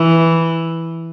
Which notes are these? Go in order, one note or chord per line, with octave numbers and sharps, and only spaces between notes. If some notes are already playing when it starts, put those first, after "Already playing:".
Already playing: E3